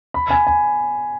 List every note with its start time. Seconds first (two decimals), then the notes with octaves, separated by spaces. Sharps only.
0.14 B5
0.30 G#5
0.47 G#5